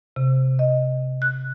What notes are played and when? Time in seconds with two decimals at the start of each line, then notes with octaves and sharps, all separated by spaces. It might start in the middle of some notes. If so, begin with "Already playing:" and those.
0.16 C3
0.59 D#5
1.22 F#6